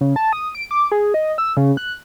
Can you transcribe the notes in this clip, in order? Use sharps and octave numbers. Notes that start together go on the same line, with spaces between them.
C#3
A5
D#6
D7
D6
G#4
D#5
E6
C#3
F#6